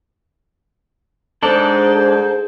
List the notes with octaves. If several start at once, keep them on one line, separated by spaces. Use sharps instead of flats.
G#2 G#3 D4 A4 C5 D5